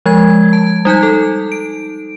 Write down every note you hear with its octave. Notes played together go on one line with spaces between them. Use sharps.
F3 G#3 G#6
A5
G3 D#4 G#5 G6
A4
D7